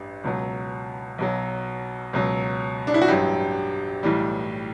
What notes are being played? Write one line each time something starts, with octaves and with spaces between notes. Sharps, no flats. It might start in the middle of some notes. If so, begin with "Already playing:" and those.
Already playing: A1 G2
C#2 B2 F#3
B1 B2 F#3
C#2 B2 F#3
D4
E4
F#4
A1 G2 F#3 G4
B1 A2 E3 G3